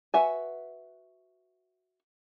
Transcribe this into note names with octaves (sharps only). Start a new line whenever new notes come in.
F#4 B4 E5 F#5 G#5